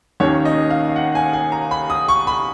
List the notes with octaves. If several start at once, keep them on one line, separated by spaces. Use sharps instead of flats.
D#2 D#3 A#3 C#4 C#5
D#5
F5
F5
F#5
G#5
G#5
A#5
B5
D#6
C#6
B5